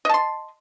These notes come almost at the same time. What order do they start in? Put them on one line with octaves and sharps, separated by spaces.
D#5 A5 C6